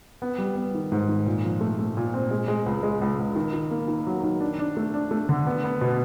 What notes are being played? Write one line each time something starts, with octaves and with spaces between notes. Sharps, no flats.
B3
G3
B3
D#3
G#2
D#3
A#2
F3
A3
A3
A#2
C4
G#3
G#3
C#2
G#3
C#2
C#2
D#3
D#3
A#3
D#3
F#3
D#3
D4
D4
A3
D4
A3
D3
B3
B3
B2